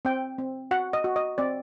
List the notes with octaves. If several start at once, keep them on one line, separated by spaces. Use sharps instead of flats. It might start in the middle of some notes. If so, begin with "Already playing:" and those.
C4 G5
C4
F#4 F#5
D#5
F#4
D#5
C4 D5